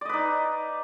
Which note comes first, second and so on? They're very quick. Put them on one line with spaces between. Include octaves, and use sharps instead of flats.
D5 D#5 B4 D#4